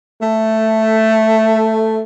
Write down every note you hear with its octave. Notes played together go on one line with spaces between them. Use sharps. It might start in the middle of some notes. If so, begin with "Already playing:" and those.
A3